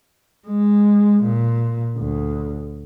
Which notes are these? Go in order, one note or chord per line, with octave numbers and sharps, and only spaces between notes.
G#3
A#2
D2